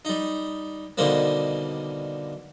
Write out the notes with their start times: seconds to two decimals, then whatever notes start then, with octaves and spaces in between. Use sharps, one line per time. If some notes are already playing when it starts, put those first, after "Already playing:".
0.05 G3 D#4
0.98 B2 D3 D#3 G3 A#3 C4